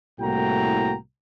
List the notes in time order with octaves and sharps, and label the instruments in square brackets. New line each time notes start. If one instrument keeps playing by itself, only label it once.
[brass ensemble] C2 A2 A#3 F#4 G5 A#5